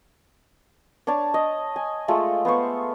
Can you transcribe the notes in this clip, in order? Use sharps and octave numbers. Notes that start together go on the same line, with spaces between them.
D4 C#5 D5 A5
D#5
G#5
G#3 A3 F4 A4
B3 C5 F5 C#6